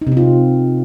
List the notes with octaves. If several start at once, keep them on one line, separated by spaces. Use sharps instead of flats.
D#4
C3
C4
F4